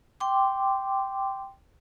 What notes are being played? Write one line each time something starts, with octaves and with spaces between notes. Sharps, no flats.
G5 C6 D6